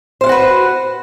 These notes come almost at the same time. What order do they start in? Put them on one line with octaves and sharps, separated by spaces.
C5 F5 F#5 F#4 B4